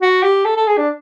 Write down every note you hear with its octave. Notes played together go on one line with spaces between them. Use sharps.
F#4
G4
A4
A4
G#4
D4